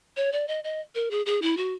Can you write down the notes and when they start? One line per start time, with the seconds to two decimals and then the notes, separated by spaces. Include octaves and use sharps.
0.16 C#5
0.32 D5
0.48 D#5
0.64 D#5
0.95 A#4
1.11 G#4
1.26 G#4
1.42 E4
1.57 F#4